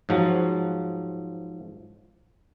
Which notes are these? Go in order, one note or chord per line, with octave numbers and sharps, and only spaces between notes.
G#2 F3 F#3